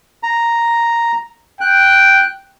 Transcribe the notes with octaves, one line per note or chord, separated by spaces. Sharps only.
A#5
G5 F#6